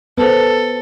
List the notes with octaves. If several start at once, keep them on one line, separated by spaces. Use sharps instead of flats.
B3 A4 B4 C5